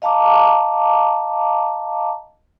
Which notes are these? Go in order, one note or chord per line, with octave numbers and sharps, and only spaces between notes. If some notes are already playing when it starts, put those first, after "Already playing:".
D#5 F5 A5 A#5 D6